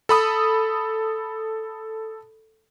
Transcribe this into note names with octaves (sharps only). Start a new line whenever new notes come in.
A4 B5 D#6